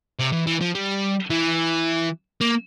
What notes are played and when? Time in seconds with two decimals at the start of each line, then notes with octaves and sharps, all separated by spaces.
0.19 C3
0.33 E3
0.47 E3
0.61 F3
0.75 G3
1.30 E3
2.41 A#3